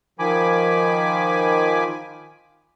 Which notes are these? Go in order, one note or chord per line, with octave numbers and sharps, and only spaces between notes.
D#3 F3 G#5 B5 D6